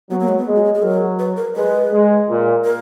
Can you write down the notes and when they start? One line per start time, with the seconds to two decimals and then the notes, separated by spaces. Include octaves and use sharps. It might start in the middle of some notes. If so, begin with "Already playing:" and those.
0.10 F#3 B3
0.20 A#3
0.28 G#3
0.38 B3
0.47 G#3
0.56 F#4
0.64 G#4
0.74 G#4
0.82 F#3 A#4
1.19 B4
1.37 A#4
1.56 G#3 B4
1.92 G#3
2.29 A#2
2.65 A#4